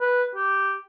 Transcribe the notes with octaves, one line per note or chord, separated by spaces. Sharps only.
B4
G4